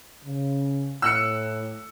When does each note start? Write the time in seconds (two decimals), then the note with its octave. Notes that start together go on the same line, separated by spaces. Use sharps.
0.24 C#3
1.02 A2 E6 F#6 C#7